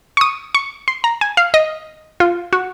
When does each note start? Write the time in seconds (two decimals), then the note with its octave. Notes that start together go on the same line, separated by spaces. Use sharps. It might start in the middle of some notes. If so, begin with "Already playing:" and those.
0.17 C#6
0.21 D#6
0.55 C#6
0.88 C6
1.04 A#5
1.21 G#5
1.37 F5
1.54 D#5
2.20 F4
2.53 F#4